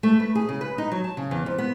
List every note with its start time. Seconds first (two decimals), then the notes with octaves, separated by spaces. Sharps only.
0.03 A3
0.20 B4
0.35 G#4
0.49 C#3
0.61 B4
0.78 D#4
0.92 F#3
1.04 A5
1.17 C#3
1.31 E2
1.46 F2
1.58 B3